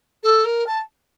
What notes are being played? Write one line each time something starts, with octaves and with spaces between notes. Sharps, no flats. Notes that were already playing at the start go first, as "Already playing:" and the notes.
A4
A#4
A5